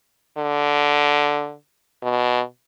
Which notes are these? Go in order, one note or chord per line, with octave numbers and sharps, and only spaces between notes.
D3
B2